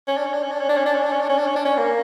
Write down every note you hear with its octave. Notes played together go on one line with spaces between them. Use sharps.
C#4
D4
C#4
D4
C#4
D4
C#4
D4
C#4
D4
C#4
D4
C#4
D4
C#4
D4
C#4
D4
C#4
A#3